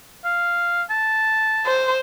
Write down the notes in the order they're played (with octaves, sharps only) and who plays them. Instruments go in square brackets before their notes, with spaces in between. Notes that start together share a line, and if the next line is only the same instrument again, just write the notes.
[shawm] F5
A5
[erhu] C5